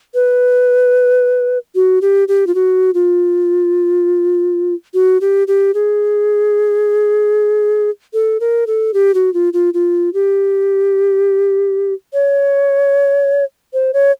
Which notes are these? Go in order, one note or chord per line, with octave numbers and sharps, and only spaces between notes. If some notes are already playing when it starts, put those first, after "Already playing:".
B4
F#4
G4
G4
F4
F#4
F4
F#4
G4
G4
G#4
A4
A#4
A4
G4
F#4
F4
F4
F4
G4
C#5
C5
C#5